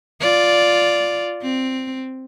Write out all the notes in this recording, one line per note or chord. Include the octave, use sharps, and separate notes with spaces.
F4 D5
C4